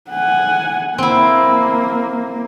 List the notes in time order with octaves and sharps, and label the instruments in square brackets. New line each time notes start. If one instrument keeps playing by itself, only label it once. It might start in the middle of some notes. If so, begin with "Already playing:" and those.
[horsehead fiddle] F#5 G#5
[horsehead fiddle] A#3 [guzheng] C4 E4